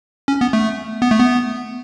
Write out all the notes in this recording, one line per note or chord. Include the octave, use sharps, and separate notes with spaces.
C#4
B3
A3
B3
A3
B3